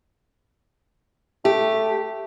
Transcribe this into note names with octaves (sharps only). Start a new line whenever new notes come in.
A3 G4